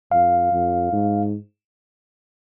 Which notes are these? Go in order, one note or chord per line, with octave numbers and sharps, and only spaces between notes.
F2 F5
F2
G#2